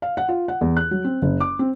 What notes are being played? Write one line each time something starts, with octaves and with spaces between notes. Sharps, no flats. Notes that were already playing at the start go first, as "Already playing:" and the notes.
F5
F#5
F4
F#5
E2
F#6
F#3
C4
F#1
D6
C4